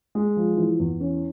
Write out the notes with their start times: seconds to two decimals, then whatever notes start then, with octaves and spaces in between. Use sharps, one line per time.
0.15 G#3
0.37 F3
0.57 E3
0.80 E2
1.00 C#4